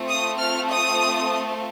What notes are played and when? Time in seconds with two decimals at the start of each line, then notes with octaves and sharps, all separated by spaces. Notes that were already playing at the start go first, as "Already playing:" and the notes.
Already playing: A3 C4 F4
0.08 D#6
0.39 F6
0.69 D#6